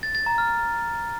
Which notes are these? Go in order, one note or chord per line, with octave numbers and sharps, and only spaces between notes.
A6
A6
A#5
F6